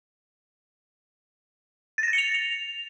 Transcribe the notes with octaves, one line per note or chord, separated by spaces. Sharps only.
A6
A#6
A6
C#7
F7